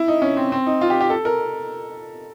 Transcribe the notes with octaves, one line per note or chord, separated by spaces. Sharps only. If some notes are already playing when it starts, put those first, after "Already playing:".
Already playing: E4
D#4
C#4
C4
C4
D#4
F4
G4
G4
A4
A#4